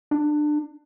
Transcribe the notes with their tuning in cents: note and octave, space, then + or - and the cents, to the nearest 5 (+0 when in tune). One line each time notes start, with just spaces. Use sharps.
D4 +25